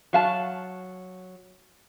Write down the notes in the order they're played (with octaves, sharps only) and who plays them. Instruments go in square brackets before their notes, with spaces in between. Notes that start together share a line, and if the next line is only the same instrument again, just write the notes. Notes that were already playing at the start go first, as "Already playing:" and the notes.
[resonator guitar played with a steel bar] F#3 F5 A5